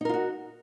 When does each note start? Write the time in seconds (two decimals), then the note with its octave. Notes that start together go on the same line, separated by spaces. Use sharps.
0.01 D#4
0.05 A#4
0.09 F4
0.14 F#4